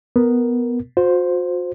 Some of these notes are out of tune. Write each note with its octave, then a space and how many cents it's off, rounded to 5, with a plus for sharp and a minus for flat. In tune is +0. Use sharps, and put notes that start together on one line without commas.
B3 +0 A#4 +0
F#4 -45 C5 -5